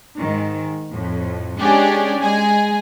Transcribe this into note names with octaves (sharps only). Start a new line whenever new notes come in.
G#2 D#3
F2 A2
G#3 C#4 D4 G4 G#4 D5
G#3 G#4 G#5